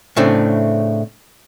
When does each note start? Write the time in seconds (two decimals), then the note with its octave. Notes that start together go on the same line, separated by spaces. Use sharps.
0.17 A2 C#3 A3 C4 D4